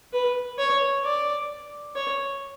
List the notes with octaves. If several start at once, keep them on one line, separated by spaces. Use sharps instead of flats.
B4
C#5
D5
C#5